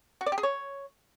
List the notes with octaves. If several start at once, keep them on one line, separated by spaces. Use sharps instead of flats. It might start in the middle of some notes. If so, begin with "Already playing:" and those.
F#4
D5
G4
G#4
C#5